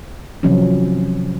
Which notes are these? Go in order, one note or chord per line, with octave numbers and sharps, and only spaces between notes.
C3 D#3 F3 F#3 C4 C#4